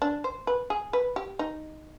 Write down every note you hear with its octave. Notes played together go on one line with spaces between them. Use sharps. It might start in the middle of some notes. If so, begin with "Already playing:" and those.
D4
C5
B4
G#4
B4
G4
D#4